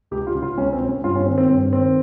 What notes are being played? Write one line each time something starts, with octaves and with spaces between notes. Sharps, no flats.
C#2 G4
F4
C#3
F4
C#2 C#4
C4
C#3
C#4
G2 F4
C#4
D#3 C4
C4
G2 C4
D#3 C4